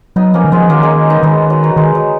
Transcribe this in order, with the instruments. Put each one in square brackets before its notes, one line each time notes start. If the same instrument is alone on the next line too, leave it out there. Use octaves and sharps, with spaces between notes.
[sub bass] F#3 [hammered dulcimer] B3 D#4
[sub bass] F3 [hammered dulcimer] A#3 C#4
[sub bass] D#3
[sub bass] F3 [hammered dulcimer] G#3 B3
[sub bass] D#3 [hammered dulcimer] F#3 A#3
[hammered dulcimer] G#3
B3 D#4
[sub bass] D#3 [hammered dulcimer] G#3 B3
[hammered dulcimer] F#3
F#3
[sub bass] D#3 [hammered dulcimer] G#3
[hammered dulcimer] F#3